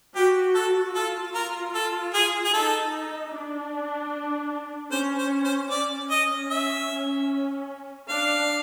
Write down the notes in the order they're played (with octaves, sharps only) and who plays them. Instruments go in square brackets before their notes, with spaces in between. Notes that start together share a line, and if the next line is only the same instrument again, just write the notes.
[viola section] F#4 [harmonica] G4
[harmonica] A4
[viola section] F4 [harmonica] A4
[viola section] F4 [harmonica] A#4
[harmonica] A4
G#4
G#4
[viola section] D#4 [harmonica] A4
[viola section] D4
[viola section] C#4 [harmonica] C5
[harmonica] C5
C5
[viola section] C#4 [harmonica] D5
[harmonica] D#5
E5
[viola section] D4 [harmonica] F5